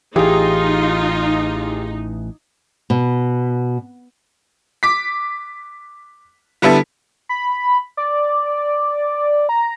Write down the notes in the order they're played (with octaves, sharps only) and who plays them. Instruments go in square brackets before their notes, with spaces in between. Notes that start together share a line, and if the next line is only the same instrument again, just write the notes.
[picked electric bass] A1 E3 [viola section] D#4 [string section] F4 [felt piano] G4 G#4
[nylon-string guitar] B2
[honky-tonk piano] D6 B6
D3 G3 B3 E4 A4
[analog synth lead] B5
D5
A#5